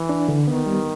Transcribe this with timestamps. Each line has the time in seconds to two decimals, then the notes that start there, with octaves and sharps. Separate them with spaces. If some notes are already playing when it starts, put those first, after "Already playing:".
Already playing: E3
0.09 D4
0.29 D3
0.48 D#3 B3
0.66 G3